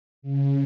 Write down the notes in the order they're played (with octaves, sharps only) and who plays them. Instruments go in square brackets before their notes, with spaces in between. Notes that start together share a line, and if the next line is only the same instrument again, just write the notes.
[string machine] C#3